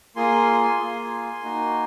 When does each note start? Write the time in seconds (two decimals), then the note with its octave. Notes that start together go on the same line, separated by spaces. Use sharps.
0.16 A#3 F4 G#4 G#5 C6
0.78 A#3 F4 G#4
1.41 A#3 D#4 F#4